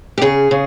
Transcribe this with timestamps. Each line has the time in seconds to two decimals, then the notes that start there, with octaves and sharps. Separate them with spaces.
0.18 G4
0.21 C#3 G#4
0.51 C#3